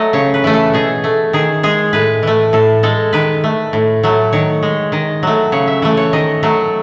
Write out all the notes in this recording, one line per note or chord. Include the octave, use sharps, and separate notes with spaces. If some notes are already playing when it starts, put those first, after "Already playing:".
Already playing: F#3 A3 D#4 D#5
C#3 C#5
B4
E3 A3
A4
B2 G#4
A3
D#3 G#4
G#3 G#4
A2 B4
E3 A3
A2 A4
G#3 A4
D#3 B4
A3
A2
F#3 A3
D#3 C#5
G#3
D#3 D#5
F#3 A3
C#3 C#5
E5
E3 A3
C#5
D#3 D#5
F#3 A3